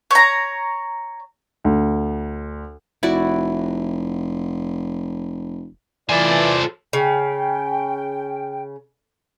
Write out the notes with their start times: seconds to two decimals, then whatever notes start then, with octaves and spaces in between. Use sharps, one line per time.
0.11 C#5 A#5
1.65 D2
3.03 F1 E4 F#4 D5
6.10 E3 F4 A4 C5 D5 G#5
6.93 C#3 G5